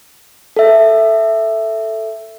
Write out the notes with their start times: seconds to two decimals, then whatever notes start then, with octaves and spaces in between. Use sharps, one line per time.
0.57 A4 E5